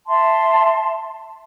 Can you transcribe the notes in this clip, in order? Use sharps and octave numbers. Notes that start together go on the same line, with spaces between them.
E5 A5 C6